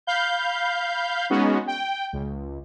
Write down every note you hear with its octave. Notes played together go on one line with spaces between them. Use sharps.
F5 B5 G6
G#3 B3 C#4 D#4 F#4
G5
C#2